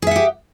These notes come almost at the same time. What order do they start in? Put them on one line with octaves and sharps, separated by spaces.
G#4 E5 F#5 G4